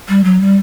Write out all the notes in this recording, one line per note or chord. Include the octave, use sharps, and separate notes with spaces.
G3
F#3
G3